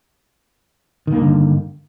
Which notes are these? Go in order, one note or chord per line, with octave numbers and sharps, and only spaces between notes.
G2 D3 D#3 A#3